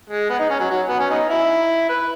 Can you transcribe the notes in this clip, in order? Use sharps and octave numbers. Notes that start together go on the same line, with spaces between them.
G#3
B3
D#4
C#4
F#3
F#3
B3
C#4
F#3 B3 D#4
E4
B4